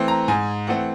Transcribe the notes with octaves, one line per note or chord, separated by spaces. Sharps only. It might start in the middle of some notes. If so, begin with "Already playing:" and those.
Already playing: E3 A3 C4
A#5
G#2 G#5
E3 A3 C4 F#5